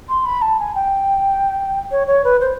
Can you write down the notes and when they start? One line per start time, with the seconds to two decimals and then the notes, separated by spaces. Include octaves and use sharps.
0.09 C6
0.25 B5
0.42 A5
0.59 G#5
0.75 G5
1.91 C#5
2.07 C#5
2.24 B4
2.41 C5